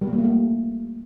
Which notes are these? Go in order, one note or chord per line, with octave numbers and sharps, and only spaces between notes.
G3
A#3
G3
A#3
A3